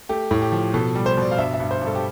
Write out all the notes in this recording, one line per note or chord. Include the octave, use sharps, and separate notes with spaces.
A3 G4
A2
G4
F3
B2 A4
G3
C5
B2
D5
F5
G2 E5
E5
G2
C5
G2
A4
G4